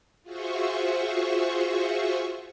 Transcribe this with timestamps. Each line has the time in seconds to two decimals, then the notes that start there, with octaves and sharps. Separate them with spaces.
0.23 F4 F#4 G#4 C5 E5 C#6